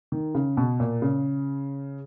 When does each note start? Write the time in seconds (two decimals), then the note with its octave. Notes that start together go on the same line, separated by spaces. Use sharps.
0.12 D#3
0.35 C#3
0.57 B2
0.80 A#2
1.02 C#3